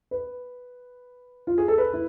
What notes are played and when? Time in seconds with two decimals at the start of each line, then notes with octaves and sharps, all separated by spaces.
0.11 B4
1.47 F4
1.58 G#4
1.68 A4
1.78 B4
1.93 E4